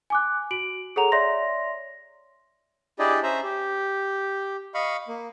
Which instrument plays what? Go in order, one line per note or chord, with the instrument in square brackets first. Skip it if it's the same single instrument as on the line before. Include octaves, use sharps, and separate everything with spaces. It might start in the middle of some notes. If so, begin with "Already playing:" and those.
[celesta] G#5 D6 F#6
F#4 D7 F#7
G#4 A4 C#5 F#5 A#5 F7
C#5 D5 E5 C6 A#6
[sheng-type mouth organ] D4 E4 G4 G#4 D5 D#5
C#4 C5 E5 A#5
G4
D#5 F5 B5 C#6
A#3